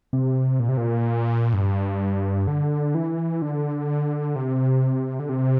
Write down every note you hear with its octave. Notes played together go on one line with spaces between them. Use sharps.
C3
A#2
C3
A#2
G2
D3
E3
D3
C3
D3
C3